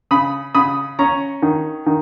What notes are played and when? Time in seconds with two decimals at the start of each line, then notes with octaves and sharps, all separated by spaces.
0.11 C#3 B5 D#6
0.55 C#3 B5 D#6
0.99 C#4 A#5 C#6
1.42 D#3
1.86 D#3